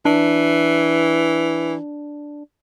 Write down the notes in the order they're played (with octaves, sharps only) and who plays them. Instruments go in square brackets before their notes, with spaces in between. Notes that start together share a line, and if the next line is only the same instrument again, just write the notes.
[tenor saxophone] E3 [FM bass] D4